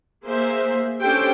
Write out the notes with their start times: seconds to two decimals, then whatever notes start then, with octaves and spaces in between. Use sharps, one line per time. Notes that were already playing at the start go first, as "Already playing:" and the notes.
0.23 A#3 G#4 C5 E5
1.01 C#4 D4 G4 A4 C5 G5